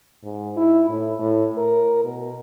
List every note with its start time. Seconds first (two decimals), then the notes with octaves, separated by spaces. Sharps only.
0.23 G#2
0.57 E4
0.90 A2
1.19 A2
1.58 A#4
2.05 B2